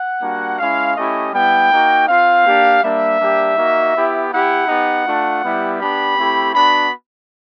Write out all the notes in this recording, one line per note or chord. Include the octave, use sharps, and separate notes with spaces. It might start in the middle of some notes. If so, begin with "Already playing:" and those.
Already playing: F#5
G3 A#3 D4 F#4
G#3 C#4 E4 F5
A3 C#4 E4 G4 D#5
G3 B3 E4 G5
A#3 D#4 F#4
C4 F4 F5
A#3 D4 G4
G3 A#3 D4 E5
G3 A#3 D4 G4
A#3 D#4 F#4
B3 E4 G4
B3 E4 G4 F#5
B3 D#4 G4
A3 D4 F4
G3 B3 E4 G4
B3 D4 G4 B5
A3 C4 E4 G4
B3 D4 F#4 B5